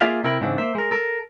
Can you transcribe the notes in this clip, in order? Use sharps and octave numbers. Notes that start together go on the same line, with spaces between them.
A#3 F4 G#4 D5 E5 F5
C3 E4 A#4 G5 B5
G#2 C#3 E3 C4 D4
A#3 C5 E5
G#3 A#4
A4 A#4